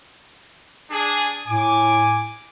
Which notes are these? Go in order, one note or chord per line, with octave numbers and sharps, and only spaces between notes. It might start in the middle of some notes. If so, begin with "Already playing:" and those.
D4 G#4
A2 G#5 D6